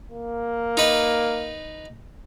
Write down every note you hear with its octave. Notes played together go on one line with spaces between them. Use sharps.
A#3
D#4 B4